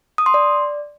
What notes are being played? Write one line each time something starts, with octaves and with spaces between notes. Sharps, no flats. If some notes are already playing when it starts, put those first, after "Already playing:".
D#6
C6
D5